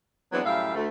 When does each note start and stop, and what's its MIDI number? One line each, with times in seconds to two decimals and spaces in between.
0.32 0.41 52
0.32 0.41 54
0.32 0.41 56
0.32 0.41 59
0.32 0.41 60
0.32 0.41 62
0.45 0.73 42
0.45 0.73 45
0.45 0.73 55
0.45 0.73 76
0.45 0.73 77
0.75 0.88 38
0.75 0.88 57